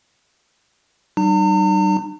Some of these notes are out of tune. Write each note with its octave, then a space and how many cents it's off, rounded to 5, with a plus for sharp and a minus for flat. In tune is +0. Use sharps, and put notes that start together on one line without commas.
G3 -35 D#4 -45 A#5 -45